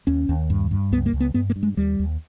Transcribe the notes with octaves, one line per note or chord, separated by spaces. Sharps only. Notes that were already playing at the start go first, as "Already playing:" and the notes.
D#2 C#4
D#2
G2
G2
C#2 B3
A#3
C#2
B3
G2 B3
A#3
G2
G#3
D#2 G3
D#2